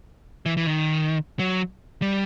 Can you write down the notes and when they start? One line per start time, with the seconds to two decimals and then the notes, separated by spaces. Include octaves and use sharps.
0.46 E3
0.57 E3
0.67 D#3
1.39 F#3
2.02 G3